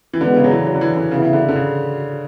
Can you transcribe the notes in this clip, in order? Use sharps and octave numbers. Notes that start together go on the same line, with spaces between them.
E3
B2 D3 G#3 B3 D4
C#3
F#3
E3
F#3
D3
E3
D3
C#3 E3 B3 E4
C#3
D3
D3
C#3